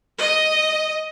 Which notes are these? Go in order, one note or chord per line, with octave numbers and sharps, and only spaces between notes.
D#5